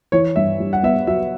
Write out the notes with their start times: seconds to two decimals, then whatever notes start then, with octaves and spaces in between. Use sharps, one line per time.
0.12 E3 C#5
0.36 G2 E5
0.60 G3
0.73 F#5
0.83 B3 E5
1.07 F#3 E5